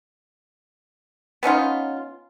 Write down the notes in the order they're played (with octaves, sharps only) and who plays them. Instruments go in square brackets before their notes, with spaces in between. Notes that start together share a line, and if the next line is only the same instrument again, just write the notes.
[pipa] B3 C#4 D#4 F4